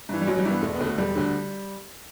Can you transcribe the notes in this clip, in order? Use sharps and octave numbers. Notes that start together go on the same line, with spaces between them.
G2 E3
G3
A1 F#3
G3
G2 E3
B3
E1 A3
B3
D2 D3
A3
E1 G3
D2 D3